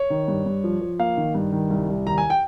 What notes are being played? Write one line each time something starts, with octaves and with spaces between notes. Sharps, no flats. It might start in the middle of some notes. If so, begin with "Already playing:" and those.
Already playing: C#5
D#3
G2
G2
F3
F3
A#3 F5
D#3
G2
D#3
C2
C2
D#2 A#5
G#5
G5